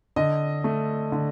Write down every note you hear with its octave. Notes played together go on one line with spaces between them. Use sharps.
D3 D#5
A3
D3